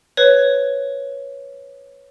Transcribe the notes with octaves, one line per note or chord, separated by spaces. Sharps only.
B4 C#5